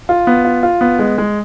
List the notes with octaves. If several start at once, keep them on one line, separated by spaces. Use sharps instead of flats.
F4
B3
F4
F4
B3
G#3
G#3